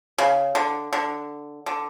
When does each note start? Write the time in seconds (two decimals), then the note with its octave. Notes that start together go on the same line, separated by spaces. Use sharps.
0.18 C#3
0.55 D3
0.93 D3
1.66 D3